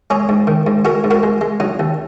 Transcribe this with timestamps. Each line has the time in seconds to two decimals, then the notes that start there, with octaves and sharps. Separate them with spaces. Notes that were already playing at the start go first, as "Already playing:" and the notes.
0.10 G#3 G#4 C#5
0.29 G#2
0.47 D#3
0.67 G#2
0.85 G#3 F#4 A#4
1.04 G#2
1.11 F#4 A#4
1.23 G#3
1.41 G#3
1.60 F#3 D#4
1.79 D#2